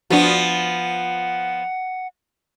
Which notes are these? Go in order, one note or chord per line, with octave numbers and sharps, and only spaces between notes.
F3 B3 D4 F#4 F#5